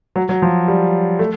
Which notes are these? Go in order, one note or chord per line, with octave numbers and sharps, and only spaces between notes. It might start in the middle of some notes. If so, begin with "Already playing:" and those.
F#3
F#3
F3
G3
A3